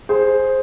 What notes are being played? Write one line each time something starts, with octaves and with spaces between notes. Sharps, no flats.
G#4 C5